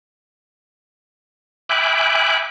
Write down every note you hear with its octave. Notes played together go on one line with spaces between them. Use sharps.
E5 G5 G#5 B5 D6 F#6